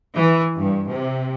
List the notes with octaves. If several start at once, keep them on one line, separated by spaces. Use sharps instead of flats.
E3
G2
C3